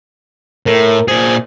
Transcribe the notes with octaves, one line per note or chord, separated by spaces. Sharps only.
A2 A#4
A#2 G#4 C5